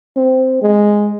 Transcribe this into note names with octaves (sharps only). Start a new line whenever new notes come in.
C4
G#3